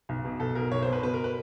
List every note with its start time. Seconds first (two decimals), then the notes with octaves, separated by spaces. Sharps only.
0.09 B1
0.25 B2
0.40 B1 A4
0.55 B2 A#4
0.71 B1 C#5
0.82 C5
0.88 B2 B4
1.03 B2 B4
1.14 A#4
1.24 B4